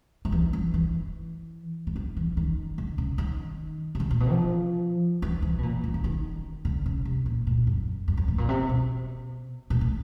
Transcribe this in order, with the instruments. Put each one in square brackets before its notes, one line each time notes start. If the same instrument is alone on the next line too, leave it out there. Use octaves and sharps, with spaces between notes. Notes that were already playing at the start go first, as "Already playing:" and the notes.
[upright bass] F3
E3
F3
E3
E3
F3
E3
D#3
D3
C#3
D#3
C#3
D3
A#2
B2
F3
E3
E3
B2
A#2
E3
E3
D#3
D3
C#3
C3
A#2
A#2
F#2
F#2
F2
A2
A#2
C3
B2
A#2
A2